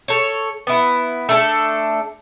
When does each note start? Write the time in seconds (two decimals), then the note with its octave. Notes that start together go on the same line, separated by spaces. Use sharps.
0.08 A4 C#5
0.67 B3 E4
1.29 A3 D4 A4